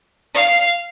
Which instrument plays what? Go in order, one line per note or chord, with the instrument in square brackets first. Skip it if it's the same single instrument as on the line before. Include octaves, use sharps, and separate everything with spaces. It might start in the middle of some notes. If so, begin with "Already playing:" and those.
[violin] F5